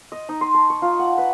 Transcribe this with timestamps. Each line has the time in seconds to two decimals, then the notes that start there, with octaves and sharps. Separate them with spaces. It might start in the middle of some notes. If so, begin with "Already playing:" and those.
0.12 D#5
0.29 D#4
0.41 C6
0.54 A5
0.70 C#6
0.82 F4
0.99 F#5
1.18 B4